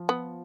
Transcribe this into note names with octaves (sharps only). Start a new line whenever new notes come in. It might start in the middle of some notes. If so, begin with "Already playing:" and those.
Already playing: F3
B3